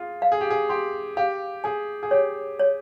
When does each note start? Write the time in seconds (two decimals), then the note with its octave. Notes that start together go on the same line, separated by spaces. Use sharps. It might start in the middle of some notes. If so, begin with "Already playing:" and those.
Already playing: F4 G#4
0.22 F5
0.32 G#4
0.41 G4
0.50 G#4
0.69 G4 C6
1.17 G4 F5
1.64 G#4 G#5
2.03 G#4
2.11 G4 C#5
2.59 C#5